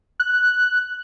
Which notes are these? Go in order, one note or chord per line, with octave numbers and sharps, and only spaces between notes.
F#6